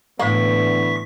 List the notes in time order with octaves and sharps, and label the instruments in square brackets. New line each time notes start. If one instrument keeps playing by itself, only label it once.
[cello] A2 [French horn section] D3 E3 B3 [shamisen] A#3 [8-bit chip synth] C#6 B6